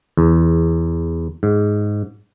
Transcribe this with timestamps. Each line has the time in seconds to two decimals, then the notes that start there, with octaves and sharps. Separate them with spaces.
0.17 E2
1.43 G#2